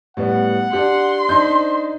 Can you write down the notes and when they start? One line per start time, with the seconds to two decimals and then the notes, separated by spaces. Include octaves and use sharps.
0.17 A2 G3 B3 F#5
0.73 D4 G4 C6
1.29 D4 D#4 C5 G6